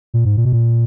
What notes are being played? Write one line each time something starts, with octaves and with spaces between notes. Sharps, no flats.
A#2
G#2
A#2
B2
A#2